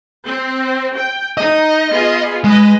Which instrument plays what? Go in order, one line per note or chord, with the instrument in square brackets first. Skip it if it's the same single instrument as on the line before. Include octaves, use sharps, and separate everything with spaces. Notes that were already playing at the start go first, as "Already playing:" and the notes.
[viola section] C4
G5
[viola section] D#4 [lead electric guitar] D#5
[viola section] B3 F4 G#4
[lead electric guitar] G#3 [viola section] B4 D#5